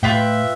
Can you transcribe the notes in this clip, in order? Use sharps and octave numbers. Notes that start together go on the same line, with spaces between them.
A2 F4 B4 E5 G5